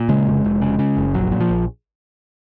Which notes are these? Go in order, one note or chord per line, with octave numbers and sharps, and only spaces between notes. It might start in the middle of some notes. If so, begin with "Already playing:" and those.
Already playing: A#2
C#3 G#3
F1
F1
C#3
C#3
F#1
A#1 F#3
A#2
F3
A#1